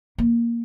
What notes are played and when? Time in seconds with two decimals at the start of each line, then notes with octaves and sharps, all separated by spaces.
0.18 A#3